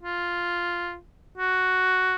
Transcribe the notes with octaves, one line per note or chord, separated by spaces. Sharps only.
F4
F#4